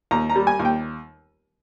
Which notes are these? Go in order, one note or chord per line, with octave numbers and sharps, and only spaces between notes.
D#2 A#5
A#5
G3
G#5
D#2
G5